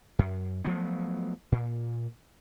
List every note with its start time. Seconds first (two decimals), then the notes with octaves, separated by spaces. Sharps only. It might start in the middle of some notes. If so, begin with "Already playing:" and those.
0.19 F#2
0.65 F3 F#3 A3 B3
1.52 A#2